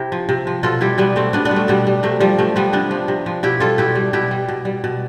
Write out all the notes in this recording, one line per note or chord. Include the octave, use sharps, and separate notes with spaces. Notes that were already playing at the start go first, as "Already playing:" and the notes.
Already playing: C3 E4 G4
F3
C3
F3
B2 F4 A4
G3 E4 G4
B2 G3 B3
G3 A3 C4
B2 B3 D4
B3 D4
G3
A3
B2 G3 B3
G3
C3 A3
F3 G3
C3 A3
F3 G3 B3
C3 B3 D4
F3
C3
F3
B2 E4 G4
G3 F4 A4
B2 E4 G4
G3
B2 E4 G4
G3
B2
G3
B2